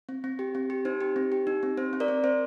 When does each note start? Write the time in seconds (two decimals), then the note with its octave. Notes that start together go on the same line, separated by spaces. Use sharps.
0.09 C4
0.24 C4
0.39 G4
0.55 C4
0.70 G4
0.85 D#4 C5
1.01 G4
1.16 C4
1.32 G4
1.47 D#4
1.63 C4
1.77 C4 C5
1.93 C4
2.00 A#4 D5
2.08 C4
2.24 C4 C5